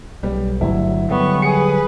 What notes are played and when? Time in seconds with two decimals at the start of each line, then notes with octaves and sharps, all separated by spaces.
0.23 B1 G3
0.61 G1 D2 F#3 E4
1.10 D3 F#3 G3 B3 C#6
1.42 G#4 B4 C#7